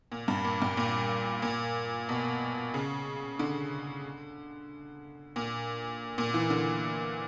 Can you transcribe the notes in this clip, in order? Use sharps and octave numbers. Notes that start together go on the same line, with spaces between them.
A#2
G2
A#2
G2
A#2
A#2
B2
C#3
D3
A#2
A#2
E3
D3